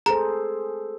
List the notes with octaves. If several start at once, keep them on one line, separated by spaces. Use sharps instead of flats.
G#4 A4 C5 A#5